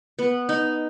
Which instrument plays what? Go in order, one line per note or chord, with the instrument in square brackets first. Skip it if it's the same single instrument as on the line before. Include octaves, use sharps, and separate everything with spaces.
[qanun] B3
D#4